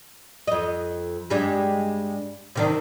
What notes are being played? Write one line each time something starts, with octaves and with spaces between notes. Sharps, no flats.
F2 D#5
G2 G3 G#3
C3 D#3 D4